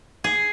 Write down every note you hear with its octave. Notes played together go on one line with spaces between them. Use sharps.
G#4